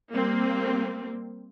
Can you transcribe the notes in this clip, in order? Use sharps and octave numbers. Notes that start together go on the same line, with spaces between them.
G3 A#3 C4